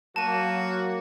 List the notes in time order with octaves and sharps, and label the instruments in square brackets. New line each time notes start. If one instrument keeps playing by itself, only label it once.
[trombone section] F#3 A#3 [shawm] F#4 [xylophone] A5 D#7